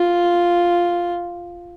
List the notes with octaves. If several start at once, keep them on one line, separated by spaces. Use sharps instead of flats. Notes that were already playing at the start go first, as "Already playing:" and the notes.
Already playing: F4